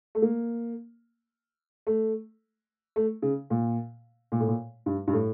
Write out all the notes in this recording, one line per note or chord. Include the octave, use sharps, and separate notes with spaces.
A3
A#3
A3
A3
C#3
A#2
A#2
A2
A#2
G2
G2
A2